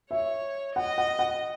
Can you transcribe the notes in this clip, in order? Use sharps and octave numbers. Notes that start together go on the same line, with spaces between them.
C#5 E5
D#5 F#5
F#5
F#5